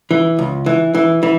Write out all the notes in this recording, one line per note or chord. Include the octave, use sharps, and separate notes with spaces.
E3
C#2
E3
E3
E3